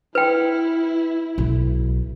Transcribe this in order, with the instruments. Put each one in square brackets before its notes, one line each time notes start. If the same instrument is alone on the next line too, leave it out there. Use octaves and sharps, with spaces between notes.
[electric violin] E4 [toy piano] B4 G5
[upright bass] B1